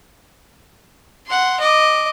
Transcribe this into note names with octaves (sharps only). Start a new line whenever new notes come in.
F#5 C6
D#5 D6